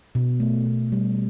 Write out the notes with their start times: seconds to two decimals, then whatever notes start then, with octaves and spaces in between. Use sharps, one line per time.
0.15 B2
0.40 A3
0.66 B2
0.92 G3